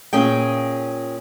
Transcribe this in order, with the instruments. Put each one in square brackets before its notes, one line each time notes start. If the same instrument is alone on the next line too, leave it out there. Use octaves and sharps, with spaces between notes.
[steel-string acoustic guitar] A#2 C#4 G#4 G5